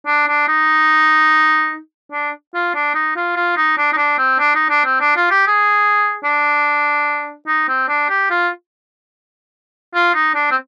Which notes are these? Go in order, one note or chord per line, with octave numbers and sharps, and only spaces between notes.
D4
D4
D#4
D4
F4
D4
D#4
F4
F4
D#4
D4
D#4
D4
C4
D4
D#4
D4
C4
D4
F4
G4
G#4
D4
D#4
C4
D4
G4
F4
F4
D#4
D4
C4